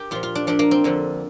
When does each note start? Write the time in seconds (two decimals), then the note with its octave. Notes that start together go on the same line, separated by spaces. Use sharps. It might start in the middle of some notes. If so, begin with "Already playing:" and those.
Already playing: G4 A#4
0.11 A#2 F3 F4
0.23 F4
0.35 D4
0.47 A#2 F3 D4
0.59 A#3
0.71 C4
0.84 F2 D3 F3